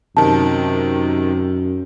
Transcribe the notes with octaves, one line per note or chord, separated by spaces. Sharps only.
F#2 C3 D#3 A5